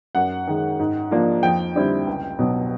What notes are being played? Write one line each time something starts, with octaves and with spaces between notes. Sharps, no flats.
F#2 F#5
D#3 G#3
G#2
F3 A#3 D4
F2 G5
D3 G3 C4 E4
C#2
B2 F#3 B3